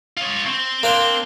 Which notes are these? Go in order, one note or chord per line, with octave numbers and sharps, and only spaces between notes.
F4 C#5
C4
A#3 D4 C5